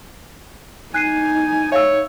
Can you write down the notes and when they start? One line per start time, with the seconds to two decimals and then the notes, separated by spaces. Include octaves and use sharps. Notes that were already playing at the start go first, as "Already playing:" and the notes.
0.94 D#4 G#5 F#6 C7 D#7
1.72 C#5 E5 F5 E6